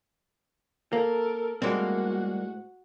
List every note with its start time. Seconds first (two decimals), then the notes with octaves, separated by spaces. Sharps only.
0.93 A#3 A4 A#4
1.62 A2 G3 G#3 A#3 C4 F#4